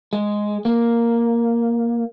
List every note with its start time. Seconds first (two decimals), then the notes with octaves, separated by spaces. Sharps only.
0.13 G#3
0.65 A#3